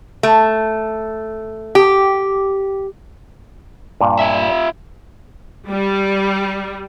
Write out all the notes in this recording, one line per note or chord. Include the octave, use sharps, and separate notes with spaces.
A3
G4
G2 A#2
F4 E5
G3